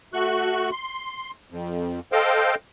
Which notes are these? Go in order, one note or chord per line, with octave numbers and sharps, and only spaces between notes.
A3 F#4 C#6 F#6
C6
F2
A4 C5 D#5 F5 G5